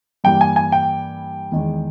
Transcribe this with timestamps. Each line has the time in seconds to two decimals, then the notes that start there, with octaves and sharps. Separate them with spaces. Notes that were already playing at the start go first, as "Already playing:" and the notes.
0.24 G2 E3 G3 A#3 G5
0.41 G#5
0.56 G#5
0.72 G5
1.52 E2 D#3 G#3